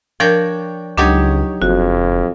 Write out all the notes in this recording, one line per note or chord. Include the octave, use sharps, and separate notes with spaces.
F3 D4 A#4 C#5 G5 G6
C#2 F#3 D4 D#4 G4 C#5
F#1 F2 F#4